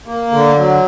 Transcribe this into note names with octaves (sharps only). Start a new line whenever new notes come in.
A#3
D3
F#3